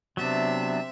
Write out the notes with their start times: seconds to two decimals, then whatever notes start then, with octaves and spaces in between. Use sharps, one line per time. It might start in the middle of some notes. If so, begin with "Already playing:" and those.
0.17 C3 F#3 B3 C4 D4 E5